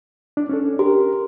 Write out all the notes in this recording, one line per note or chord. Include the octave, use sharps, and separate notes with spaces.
D4
C#4 D4 A4
G4 A#4